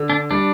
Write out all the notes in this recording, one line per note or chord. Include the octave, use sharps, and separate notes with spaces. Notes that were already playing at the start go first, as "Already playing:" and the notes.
Already playing: D3
D4
G3 D4